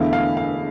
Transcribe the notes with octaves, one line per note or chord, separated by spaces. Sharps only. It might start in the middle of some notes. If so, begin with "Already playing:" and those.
Already playing: E1 E2 D3 A3 E4 F5
F5
F5